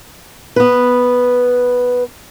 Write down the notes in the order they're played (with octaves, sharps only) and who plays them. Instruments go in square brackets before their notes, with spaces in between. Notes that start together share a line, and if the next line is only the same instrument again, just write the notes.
[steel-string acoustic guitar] B3 B4